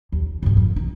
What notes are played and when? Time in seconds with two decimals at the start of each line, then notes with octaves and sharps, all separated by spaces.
0.12 D#2
0.43 C#2 G#2
0.57 F2
0.76 D#4